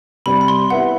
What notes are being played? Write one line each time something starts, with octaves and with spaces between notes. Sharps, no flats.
C3 G3 C4 G4 B5
B5
C6
B3 E4 G4 B4 E5 F#5